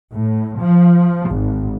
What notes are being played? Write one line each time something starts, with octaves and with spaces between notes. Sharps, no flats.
A2
F3
G#1